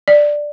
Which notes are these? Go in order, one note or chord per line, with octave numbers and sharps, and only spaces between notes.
D5